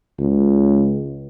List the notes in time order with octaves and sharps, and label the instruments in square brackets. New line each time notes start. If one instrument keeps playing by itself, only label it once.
[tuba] C#2